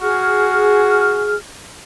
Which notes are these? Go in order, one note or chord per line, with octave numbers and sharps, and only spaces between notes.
F#4 G#4 F6